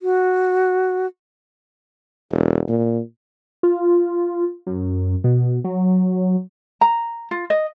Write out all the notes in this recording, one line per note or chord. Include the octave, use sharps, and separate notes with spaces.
F#4
E1
A#2
F4
F#2
B2
F#3
A#5
F4
D#5